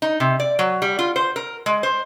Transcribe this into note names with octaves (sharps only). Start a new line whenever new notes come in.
D#4
C3
D5
F#3
G3
F4
C5
A#4
G#3
C5